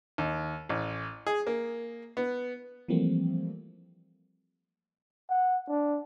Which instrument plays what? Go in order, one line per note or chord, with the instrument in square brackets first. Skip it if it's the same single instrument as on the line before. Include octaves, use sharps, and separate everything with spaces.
[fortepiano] D#2
A1
G#4
A#3
B3
[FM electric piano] E3 F3 G3 A3 A#3 C4
[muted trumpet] F#5
D4